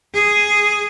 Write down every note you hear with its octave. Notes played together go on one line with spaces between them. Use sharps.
G#4